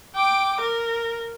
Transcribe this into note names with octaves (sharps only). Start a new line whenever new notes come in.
G5 D6
A#4